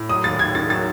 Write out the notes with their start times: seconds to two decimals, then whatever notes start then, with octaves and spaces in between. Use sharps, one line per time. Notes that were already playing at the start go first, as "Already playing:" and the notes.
Already playing: A2
0.09 F#3 D#6
0.24 D#2 A6
0.39 D#2 G#6
0.55 D#3 A6
0.70 F#3 A6